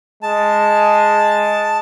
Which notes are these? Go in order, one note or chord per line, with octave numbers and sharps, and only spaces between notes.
G#3 A5